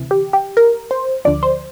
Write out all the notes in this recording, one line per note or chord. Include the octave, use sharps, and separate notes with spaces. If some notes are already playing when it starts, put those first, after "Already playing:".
Already playing: D2 C3 E3
G4
G4
A#4
C5
D2 D3 F3 D5
C5